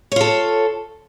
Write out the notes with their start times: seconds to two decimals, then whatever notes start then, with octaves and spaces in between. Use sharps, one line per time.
0.12 C#5
0.16 F4
0.21 A4